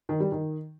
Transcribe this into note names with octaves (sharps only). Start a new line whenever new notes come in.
D#3
G3
D#3